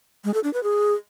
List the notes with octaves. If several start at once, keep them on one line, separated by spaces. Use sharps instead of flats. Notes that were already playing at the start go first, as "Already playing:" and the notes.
G#3
A4
D4
B4
G#4